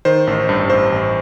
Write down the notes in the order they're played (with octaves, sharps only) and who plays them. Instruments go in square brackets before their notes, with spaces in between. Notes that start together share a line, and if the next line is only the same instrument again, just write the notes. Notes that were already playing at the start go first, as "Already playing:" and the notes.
[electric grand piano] D#3 C5
A1
G2
A1 C5
A1